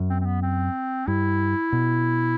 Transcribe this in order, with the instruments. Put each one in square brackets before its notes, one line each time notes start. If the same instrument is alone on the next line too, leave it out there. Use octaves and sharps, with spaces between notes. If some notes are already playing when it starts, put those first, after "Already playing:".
Already playing: [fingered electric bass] F#2
[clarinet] C4
C4
B3
C4
[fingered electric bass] G2 [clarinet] E4
[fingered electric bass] B2